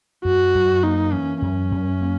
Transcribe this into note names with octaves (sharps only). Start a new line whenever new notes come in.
F#2 F#4
F#2
A#3 D#4
E3 C#4
F#2 C#4
F#2
A#3